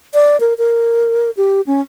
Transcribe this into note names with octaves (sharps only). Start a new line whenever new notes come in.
D5
A#4
A#4
G4
C#4